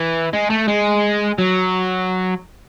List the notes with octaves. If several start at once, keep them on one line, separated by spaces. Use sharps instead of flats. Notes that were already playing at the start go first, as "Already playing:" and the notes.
Already playing: E3
G#3
A3
G#3
F#3